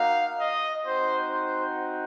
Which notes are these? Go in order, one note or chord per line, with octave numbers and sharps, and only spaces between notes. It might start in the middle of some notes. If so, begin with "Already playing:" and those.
Already playing: A#3 D#4 F#4 F5
D#5
C4 D#4 F#4 C5
C5